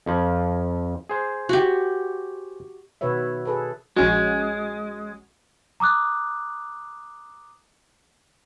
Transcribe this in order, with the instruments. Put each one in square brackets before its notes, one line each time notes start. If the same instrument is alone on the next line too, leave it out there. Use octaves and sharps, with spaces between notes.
[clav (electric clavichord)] F2 F3
G#4 C5
[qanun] F#4 G4
[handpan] B2 D#3 F#4 B4 C#5 E5
G#4 A4 B4
[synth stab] A#1 C#4 F#4 [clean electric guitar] G#3
[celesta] A#5 D6 D#6 F#6